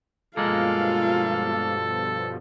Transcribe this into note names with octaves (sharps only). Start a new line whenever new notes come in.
G2 B2 F3 G#3 A#3 F4 A4 F5